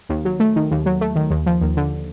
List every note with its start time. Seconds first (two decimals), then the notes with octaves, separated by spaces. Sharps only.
0.09 D#2
0.25 F#3
0.40 A3
0.56 D#3
0.71 D#2
0.86 F#3
1.01 A3
1.16 D#3
1.31 D#2
1.46 F3
1.61 D#2
1.77 D3